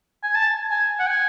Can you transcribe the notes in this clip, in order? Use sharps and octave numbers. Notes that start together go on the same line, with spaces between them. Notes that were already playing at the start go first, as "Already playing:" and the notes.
G#5
A5
G#5
F#5
G#5